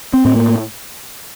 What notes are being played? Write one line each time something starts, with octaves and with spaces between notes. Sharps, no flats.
C4
A2 C4
A#3